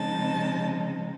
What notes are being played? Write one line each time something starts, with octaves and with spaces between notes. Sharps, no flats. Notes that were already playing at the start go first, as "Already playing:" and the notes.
Already playing: C#3 F3 G#3 C4 D#4 A5